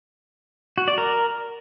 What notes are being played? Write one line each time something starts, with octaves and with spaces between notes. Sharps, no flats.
F#4
D5
A#4